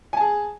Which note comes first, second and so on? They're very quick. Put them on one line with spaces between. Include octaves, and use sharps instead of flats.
G#5 A5 G#4